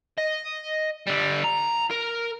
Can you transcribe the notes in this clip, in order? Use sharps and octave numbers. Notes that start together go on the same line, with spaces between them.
D#5
D3 G3
A#5
A#4